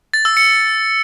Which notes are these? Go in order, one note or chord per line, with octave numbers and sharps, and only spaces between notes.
A6
E6
C#7